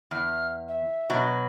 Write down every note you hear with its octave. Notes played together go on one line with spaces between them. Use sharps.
E2 F6
E5
B2 F#3